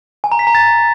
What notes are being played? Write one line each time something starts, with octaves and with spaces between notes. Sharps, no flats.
G#5
A#5
B6
A#5
A6